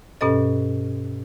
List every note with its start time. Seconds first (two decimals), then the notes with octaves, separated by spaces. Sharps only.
0.21 G2 B2 C#4 A4 D#5